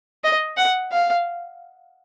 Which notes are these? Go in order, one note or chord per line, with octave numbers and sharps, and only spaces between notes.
D#5
F#5
F5